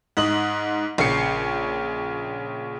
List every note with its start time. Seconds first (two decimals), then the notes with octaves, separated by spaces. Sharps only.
0.17 G#2 D#5 F#7
0.98 A#1 C#3 C7 C#7